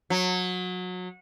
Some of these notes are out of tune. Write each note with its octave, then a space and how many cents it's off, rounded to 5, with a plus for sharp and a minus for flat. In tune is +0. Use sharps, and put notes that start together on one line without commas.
F#3 -25